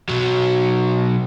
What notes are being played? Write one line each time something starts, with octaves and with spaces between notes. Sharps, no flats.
B2 F#3